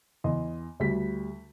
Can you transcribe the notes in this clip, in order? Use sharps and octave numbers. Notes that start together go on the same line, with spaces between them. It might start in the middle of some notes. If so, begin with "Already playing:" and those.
E2 D#5 C6
D2 G3 B6